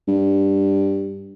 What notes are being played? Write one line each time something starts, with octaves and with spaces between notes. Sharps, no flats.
G2